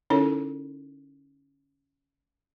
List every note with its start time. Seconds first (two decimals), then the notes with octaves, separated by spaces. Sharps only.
0.10 D3 C#4 D#4 E4 A4 C#5